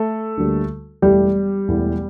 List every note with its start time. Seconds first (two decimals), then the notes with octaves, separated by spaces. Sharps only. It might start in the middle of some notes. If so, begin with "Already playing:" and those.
Already playing: A3 A4
0.37 D2 D3 G3 A#3
1.02 E1 E2 E3 G3 A3 G4
1.68 E1 E2 E3 A3